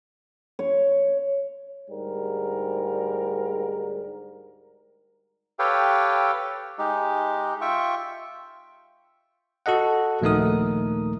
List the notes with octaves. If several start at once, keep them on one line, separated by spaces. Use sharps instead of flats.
C#5
D2 G#2 G3 A#4
G4 A4 B4 C#5 F5 G5
G#3 D#4 G4
F4 E5 G5 C#6
F#4 A4 D#5 F#5
A#1 D#2 A3 D#4 A#4 D#6